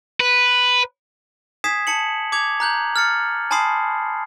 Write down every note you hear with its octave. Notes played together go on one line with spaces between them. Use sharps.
B4
G#5 D#6 G#6 B6 C7 E7
A5 C#7 F#7
D6 G#6 F7
A#5 F#6 G6 F#7
F6 A6 C#7
G#5 A5 B5 C6 D#6 C7